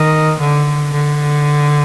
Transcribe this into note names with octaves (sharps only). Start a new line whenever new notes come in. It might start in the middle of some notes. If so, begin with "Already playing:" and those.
Already playing: D#3
D3
D3